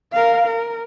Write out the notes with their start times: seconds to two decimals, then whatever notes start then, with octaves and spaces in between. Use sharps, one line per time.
0.13 A#4 F5
0.47 A#4